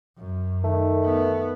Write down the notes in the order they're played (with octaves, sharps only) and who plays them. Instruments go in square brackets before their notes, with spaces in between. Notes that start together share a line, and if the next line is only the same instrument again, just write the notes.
[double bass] F#2
[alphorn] D#3 [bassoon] A3
[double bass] B3